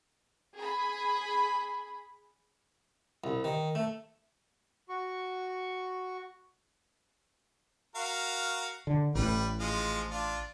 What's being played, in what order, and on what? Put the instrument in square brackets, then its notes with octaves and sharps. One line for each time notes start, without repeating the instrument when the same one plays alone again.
[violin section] G#4 B5
[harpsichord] C2
D#3
A3
[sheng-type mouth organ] F#4 C#6
[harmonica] F#4 A#4 F5
[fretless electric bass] D3
[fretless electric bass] A1 A2 [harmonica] G3 B4
[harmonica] F3 G#3 F5
D4 F4